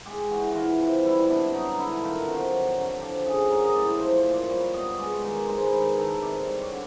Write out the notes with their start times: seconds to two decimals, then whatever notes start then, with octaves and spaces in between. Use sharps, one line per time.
0.06 G#3 G4
0.31 E3 F#4
0.51 E3 F4 F#4
0.79 C3
1.05 G3 E4
1.29 B2 D4
1.53 F#3 D#4
1.78 D3 E4
2.03 D#3 F4
2.27 C3 F#4
2.53 F#3
2.77 D3
3.01 F3 G4
3.26 C#3 G#4
3.51 F#3 A#4
3.64 D#5
3.75 A2 D5
3.88 C5
4.00 F3 C5
4.17 C5
4.25 A#2
4.34 D5
4.50 G3 C#5
4.74 B2 D#5
4.98 G#3 D5
5.24 D#3
5.48 G#3 C5
5.65 B4
5.72 D#3
5.97 D#3 A4
6.14 C#5
6.22 C3 D5
6.47 G3 C#5
6.59 C#5 D5
6.72 D3